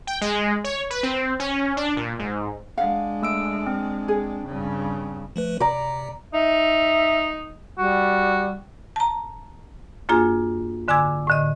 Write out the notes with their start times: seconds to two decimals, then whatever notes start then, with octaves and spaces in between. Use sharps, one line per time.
0.07 G5
0.21 G#3
0.64 C#5
0.90 B4
1.03 C4
1.40 C#4
1.77 D4
1.97 A#2
2.19 G#2
2.78 G#3 D4 F5 F#5
3.22 A3 E6 D7
3.67 C4
4.08 G#4
4.46 G2 C#3
5.36 F3 A3 B4
5.60 C3 D5 A#5
6.34 D#4 E5
7.78 G3 F#4
8.96 A5 A#5
10.09 F#2 A#3 D4 F4 G#4 G#5
10.88 G#2 D3 G#5 D6 E6 G#6
11.27 A2 D3 D#5